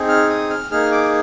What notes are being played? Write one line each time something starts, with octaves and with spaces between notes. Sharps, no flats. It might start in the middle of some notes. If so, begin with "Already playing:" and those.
Already playing: C4 D#4 G#4
F6
D#6
F6
A#3 D#4 G#4 F6
D6